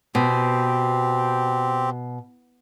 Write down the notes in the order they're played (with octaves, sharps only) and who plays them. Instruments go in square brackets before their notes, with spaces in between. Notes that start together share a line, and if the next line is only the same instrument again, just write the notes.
[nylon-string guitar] B2 [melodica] C4 G4